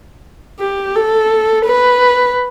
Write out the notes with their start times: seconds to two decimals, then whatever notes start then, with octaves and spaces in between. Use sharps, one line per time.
0.59 G4
0.95 A4
1.66 B4